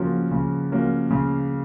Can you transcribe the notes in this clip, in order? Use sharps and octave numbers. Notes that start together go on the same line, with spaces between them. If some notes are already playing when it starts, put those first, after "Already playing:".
Already playing: C#3 F3 A#3 C#4 F#4
C#3
F3 A#3 C#4 F#4
C#3